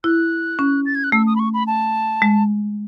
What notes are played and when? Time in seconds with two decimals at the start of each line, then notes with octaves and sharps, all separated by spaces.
0.04 E4 F#6
0.59 C#4
0.86 A6
0.95 G#6
1.04 F#6
1.12 A3 E6
1.27 D#6
1.36 B5
1.39 C#6
1.54 B5
1.67 A5
2.22 G#3